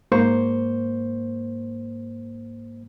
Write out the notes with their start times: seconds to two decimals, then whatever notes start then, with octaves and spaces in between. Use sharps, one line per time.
0.12 G#2 A#3 C5 C#6